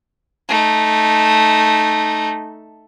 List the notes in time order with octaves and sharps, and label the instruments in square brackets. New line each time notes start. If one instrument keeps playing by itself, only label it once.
[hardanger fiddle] A3 D#4